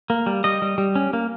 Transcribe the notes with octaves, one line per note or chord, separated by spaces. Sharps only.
A#3
G3
G3 D#5
G3
G3
C#4
A#3